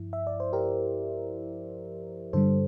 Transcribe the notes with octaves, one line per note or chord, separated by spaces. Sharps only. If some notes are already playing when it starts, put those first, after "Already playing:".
Already playing: G2 F3 E4
E5
D5
C5
G4 A#4
G2 D3 G3 A4 C5